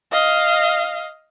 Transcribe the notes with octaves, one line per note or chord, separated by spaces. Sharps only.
D#5 F5